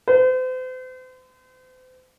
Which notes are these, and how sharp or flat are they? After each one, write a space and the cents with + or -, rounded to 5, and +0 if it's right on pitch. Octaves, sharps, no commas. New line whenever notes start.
C5 -40